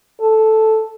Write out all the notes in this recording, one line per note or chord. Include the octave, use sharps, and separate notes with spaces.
A4